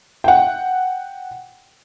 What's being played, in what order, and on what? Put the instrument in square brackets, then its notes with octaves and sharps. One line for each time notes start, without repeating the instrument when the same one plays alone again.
[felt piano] F#5 G5